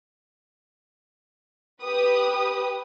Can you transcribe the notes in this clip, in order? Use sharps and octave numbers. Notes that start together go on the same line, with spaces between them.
G4 B4 D#6